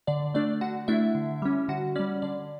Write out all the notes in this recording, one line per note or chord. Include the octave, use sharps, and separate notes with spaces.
D3 D5
A3 D4 D5
D3 F#4 F#5
A3 D4 E4 E5
D3
G3 C#4
D3 F#4 F#5
G3 C#4 D5
D3 D5